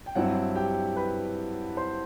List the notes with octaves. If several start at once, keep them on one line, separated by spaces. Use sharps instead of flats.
G5
G2 F#3 C4 E4 F#5
G4 G5
B4 B5
C5 C6